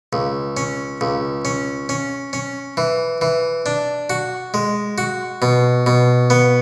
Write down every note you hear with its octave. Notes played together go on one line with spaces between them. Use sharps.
C#2
C#4
C#2
C#4
C#4
C#4
E3
E3
D4
F#4
G#3
F#4
B2
B2
B3